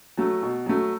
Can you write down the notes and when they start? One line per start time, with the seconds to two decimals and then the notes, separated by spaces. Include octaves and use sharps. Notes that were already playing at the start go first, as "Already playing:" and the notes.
0.17 F#3 A3
0.43 B2
0.66 F#3 A3